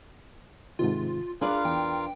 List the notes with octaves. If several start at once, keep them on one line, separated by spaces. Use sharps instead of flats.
G#2 C3 D#3 F4
D4 F4 G#4 A#4 B4 D5 F5
E2 G5